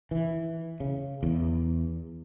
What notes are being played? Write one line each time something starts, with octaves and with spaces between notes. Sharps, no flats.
E3
C#3
E2